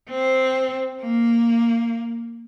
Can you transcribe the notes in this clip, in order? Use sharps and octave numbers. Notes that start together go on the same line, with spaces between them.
C4
A#3